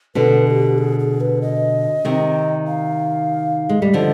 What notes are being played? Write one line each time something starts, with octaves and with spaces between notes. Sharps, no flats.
B2 D3 B4
G#4
G4
G#4
G#4
B4
D#5
C3 D#3
F5
G#3
G3
D3 F3 D#5